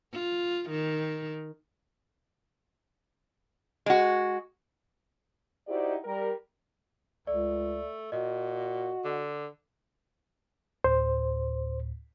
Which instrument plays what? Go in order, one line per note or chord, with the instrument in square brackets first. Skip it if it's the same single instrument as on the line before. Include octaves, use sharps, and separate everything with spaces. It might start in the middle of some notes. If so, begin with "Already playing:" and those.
[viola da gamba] F4
D#3
[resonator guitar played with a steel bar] G#3 F#4
[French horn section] D#4 E4 F#4 G4 C5 D5
G3 A#4
[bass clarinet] C#2 [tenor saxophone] A3 [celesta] D5
[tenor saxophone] A#2 [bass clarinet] F#4 [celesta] D#5
[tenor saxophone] D3
[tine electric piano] D2 A2 [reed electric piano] C5